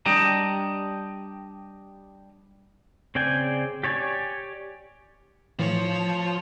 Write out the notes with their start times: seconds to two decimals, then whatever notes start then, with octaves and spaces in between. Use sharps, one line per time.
0.06 G3 D4 G4 D5 D#5 A#5
3.15 C#3 C4 D5 G5 G#5
3.83 G4 C#5 D5 G#5
5.59 A2 E3 F3 C#5